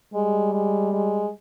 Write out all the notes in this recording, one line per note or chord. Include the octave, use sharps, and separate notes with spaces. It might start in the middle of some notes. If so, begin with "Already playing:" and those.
G3 G#3
G#3
G#3